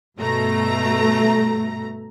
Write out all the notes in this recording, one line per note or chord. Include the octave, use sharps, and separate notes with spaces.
G2 B2 A3 A#5